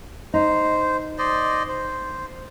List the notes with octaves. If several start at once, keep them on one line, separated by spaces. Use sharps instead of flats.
D#4 C5
C5 D5 D#5
C5